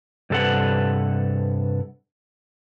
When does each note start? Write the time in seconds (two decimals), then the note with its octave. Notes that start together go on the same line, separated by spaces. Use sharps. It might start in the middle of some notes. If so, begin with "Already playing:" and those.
0.30 G2 C3 A4 B4 F#5